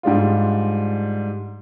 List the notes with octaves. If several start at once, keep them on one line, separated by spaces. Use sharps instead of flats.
G#2 G3 D4 F4